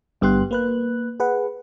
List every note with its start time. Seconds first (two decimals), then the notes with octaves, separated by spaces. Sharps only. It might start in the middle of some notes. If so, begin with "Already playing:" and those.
0.21 G1 G2 B3 G4 C6 F#6
0.51 A#3 B4 F#6
1.20 G#4 B4 F#5